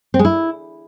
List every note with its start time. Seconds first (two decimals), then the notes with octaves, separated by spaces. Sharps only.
0.14 C4
0.19 G#3
0.25 E4